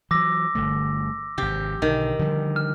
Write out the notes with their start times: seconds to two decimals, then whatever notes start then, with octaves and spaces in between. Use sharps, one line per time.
0.11 E3 F#3 D6 E6 A#6
0.55 G1 D3 A3
1.38 G#1 C3 G4
1.82 B1 D3 D#3
2.19 D3 F3 G3
2.56 F6